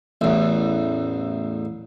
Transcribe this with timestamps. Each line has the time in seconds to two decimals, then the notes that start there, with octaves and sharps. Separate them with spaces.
0.21 A1 E2